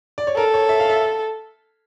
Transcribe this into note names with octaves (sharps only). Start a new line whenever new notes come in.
D5
C#5
A4 A#4
C#5
E5
F5
E5